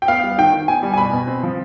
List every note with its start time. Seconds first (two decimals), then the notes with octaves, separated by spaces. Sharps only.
0.02 G5
0.08 B3 F5
0.24 G3
0.38 D#3 G5
0.53 D#3
0.68 B3 G#5
0.83 G3
0.93 G#5
0.98 B2 B5
1.13 B2
1.27 C4
1.43 F3